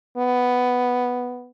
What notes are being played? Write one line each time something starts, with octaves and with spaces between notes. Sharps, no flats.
B3